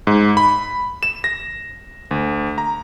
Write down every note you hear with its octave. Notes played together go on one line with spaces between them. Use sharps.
G#2
B5
E7
A#6
D2
A#5